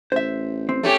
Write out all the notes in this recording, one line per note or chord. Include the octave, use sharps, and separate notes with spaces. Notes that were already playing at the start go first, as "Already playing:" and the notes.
A1 C5 E5
C4
A3 C#4 G4